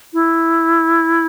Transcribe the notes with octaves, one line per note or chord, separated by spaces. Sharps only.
E4